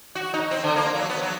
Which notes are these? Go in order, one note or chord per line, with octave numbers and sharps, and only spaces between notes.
F#4
D#4
C4
D3
A#3
F#3
B3
F#3